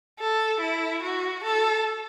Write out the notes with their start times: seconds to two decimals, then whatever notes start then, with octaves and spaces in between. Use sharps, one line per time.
0.20 A4
0.61 E4
1.02 F#4
1.44 A4